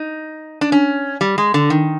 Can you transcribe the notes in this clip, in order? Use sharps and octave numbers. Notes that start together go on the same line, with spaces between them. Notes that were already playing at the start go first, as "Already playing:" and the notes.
Already playing: D#4
D4
C#4
G3
G#3
D3
D#3